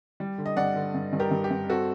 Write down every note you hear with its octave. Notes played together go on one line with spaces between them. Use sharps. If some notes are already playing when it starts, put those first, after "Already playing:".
G3
D3
D#5
G2 D5 F#5
D3
G2
G2
G4 A#4
G2
G4
G2
C4 F#4 A4